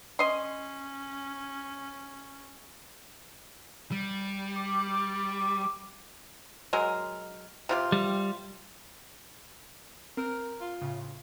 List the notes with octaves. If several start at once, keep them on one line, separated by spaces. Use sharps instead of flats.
C#4 D#5 C6
G3
D6
F#3 G#3 A#4
C3 F4 G4
G3
C4 A#4
F4
A2 C#3